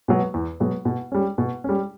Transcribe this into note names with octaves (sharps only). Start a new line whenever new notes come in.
B2 F#3 B3
E2
B2 F#3 B3
B2
G3 C#4
B2
G3 C#4